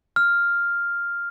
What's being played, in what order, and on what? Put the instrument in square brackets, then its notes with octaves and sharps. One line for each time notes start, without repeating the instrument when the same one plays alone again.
[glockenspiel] F6